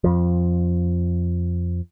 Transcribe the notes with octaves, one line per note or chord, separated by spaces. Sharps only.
F2 F3